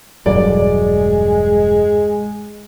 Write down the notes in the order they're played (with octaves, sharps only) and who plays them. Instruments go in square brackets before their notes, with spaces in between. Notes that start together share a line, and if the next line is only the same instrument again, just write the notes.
[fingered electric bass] E1 G2 F#3 [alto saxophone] G#3 [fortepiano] D5